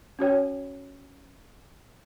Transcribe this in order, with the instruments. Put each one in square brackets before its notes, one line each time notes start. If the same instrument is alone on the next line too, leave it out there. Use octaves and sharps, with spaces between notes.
[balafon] C#4 F#4 C#5 G5